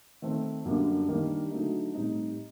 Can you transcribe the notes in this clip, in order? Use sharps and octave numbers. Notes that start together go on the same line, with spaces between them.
D#3 A3 C4 D#4
F#2 D3 G3 A#3 D4
D#3 G3 A#3 D4
D3 F#3 A3 D#4
A2 G3 C4 D#4